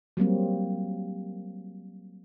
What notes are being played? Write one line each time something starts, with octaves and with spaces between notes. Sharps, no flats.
F#3 G3 A#3 C4